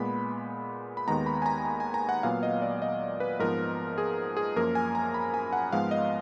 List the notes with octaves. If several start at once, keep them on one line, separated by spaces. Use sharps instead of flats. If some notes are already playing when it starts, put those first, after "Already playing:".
Already playing: A#2 G#3 B3 B5
B5
D#2 D#3 G#3 B3 A#5
B5
G#5
A#5
A#5
G#5
A#5
F#5
A#2 F#3 B3 F5
D#5
D5
D#5
B4
G#2 F3 B3 A#4
G#4
G#4
F#2 F3 A#3 A#4
G#5
A#5
B5
G#5
F#5
G#2 F3 G#3 B3 F5
D#5